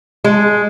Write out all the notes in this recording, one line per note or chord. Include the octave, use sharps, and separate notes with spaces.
G#3